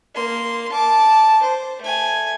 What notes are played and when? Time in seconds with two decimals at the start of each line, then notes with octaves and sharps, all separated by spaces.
0.14 A#3 C6
0.72 A5 D6
1.42 C5
1.82 A3 G#5